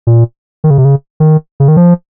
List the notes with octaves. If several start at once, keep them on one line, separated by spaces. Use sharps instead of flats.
A#2
D#3
C#3
C3
C#3
D#3
C#3
D#3
F3